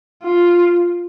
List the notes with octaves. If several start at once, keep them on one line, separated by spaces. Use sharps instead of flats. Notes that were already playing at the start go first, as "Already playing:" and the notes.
F4